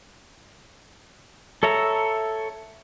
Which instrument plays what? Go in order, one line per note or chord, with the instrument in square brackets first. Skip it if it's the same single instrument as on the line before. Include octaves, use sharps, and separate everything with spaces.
[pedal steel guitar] A4 C#5 E5 A#5